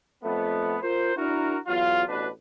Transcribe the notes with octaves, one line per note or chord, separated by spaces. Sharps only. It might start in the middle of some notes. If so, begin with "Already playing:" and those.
F2 A3 B3
F4 A#4 C5
D4 E4 F#4 A#4
E2 F#3 F4
A1 B2 D4 B4